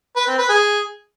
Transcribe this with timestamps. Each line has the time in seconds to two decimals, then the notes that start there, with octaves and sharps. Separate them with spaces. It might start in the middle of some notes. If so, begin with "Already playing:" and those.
0.16 B4
0.27 C4
0.38 B4
0.49 G#4